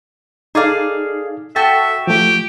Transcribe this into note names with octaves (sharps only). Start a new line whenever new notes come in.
D#4 G#4 A4 D5 F5
F#4 A4 E5 G5 A5
F3 A3 G4